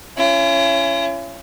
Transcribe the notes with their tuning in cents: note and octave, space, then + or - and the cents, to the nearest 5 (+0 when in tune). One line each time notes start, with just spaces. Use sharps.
C#4 +0 E4 +45